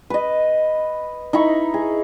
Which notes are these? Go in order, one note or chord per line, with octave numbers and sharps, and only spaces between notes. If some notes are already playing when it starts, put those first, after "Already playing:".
B4 D#5
D#4 E4 B5 C#6
G#4